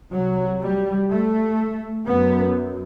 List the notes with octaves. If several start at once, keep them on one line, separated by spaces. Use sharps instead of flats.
C2 C3 F#3
G3
A3
F#2 B3